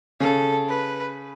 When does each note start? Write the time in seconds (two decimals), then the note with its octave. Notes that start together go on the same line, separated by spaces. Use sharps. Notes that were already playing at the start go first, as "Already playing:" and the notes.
0.20 C#3 A4
0.69 B4